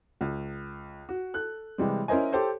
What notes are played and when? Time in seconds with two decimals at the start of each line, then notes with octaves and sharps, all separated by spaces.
0.21 C#2
1.09 F#4
1.34 A4 F#6
1.78 C3 E3 G3 G#3
2.08 C#4 E4 A#4 C5 D#5 G#5
2.32 G4 A4 C5 C#5